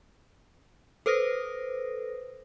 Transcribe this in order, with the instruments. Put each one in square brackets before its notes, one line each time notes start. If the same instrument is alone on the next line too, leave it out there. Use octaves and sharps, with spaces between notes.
[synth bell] A4 B4 C5 D#6 A#6